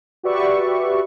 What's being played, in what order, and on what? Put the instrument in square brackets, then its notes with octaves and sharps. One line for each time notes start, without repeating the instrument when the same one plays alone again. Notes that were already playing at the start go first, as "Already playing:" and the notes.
[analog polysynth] F#4 G4 B4 D5 E5 C#6